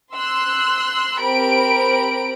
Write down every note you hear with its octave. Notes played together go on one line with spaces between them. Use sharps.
C6 E6 F#6
C4 G4 A#4 B5 D7